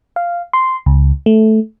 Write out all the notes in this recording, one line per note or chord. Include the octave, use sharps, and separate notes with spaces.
F5
C6
C#2
A3